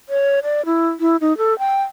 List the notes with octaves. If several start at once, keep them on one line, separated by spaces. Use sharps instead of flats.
C#5
D5
E4
E4
D#4
A4
G5